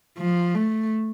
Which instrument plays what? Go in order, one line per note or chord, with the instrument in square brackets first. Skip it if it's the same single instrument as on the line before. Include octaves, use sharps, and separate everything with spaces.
[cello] F3
A3